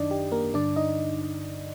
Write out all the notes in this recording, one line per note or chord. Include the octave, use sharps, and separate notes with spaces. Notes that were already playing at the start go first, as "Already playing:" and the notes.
Already playing: F#2 D#3 D4 D#4 D5 D#5
G4
A#3 A#4
G2 D3 D4 D5
D#4 D#5